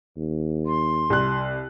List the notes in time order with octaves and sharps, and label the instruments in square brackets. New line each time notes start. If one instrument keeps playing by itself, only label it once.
[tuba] D#2
[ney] C6
[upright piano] C2 F#6